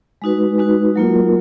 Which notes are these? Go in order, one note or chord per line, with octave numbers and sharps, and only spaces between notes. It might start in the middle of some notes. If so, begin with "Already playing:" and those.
G#3 D#4 F#4 B4
G#3 D#4 F#4 B4
F#3 A#3 F4 A#4